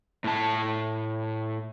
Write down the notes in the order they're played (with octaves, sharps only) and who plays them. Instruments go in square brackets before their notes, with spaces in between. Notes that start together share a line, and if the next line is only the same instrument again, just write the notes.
[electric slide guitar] A2 A5